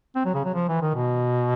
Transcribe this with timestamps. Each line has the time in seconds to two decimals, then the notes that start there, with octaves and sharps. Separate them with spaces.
0.16 C4
0.26 F#3
0.35 C#3
0.45 F#3
0.55 F3
0.69 E3
0.82 D#3
0.95 B2